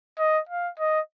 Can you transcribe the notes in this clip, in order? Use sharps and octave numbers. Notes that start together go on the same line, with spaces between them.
D#5
F5
D#5